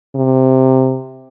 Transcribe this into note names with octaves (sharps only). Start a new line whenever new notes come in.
C3